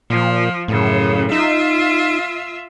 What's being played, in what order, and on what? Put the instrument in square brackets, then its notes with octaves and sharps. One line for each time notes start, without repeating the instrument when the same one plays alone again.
[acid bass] A#2 [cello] F3
[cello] F#2 C#3 [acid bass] A2
[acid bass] D#4 [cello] F4 E5